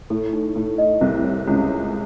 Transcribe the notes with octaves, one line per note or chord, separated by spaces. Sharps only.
A2 A4
D#4
A2 A4
D#5
C2 C3 E4
C#5
C#2 C#3 G#4
C#5